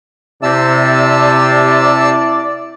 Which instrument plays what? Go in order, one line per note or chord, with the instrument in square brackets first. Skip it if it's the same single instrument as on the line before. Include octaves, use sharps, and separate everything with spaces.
[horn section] C3 [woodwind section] E4 D5 [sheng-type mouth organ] A5 E6